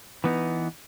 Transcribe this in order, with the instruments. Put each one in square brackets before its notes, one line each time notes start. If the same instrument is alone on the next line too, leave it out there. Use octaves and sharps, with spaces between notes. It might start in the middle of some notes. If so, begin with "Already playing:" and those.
[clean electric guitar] E3 B3 D#4